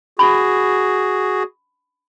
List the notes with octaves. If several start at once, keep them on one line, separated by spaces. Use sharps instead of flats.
F#4 G#4 B5